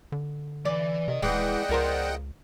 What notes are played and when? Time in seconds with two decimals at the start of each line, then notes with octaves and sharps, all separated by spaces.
0.12 D3
0.65 E3 D5
1.08 C3 A#4 D#5
1.22 D#1 E3 G#3 G#4 D5 D#5 F#5 G5
1.69 C#2 F4 A#4 C5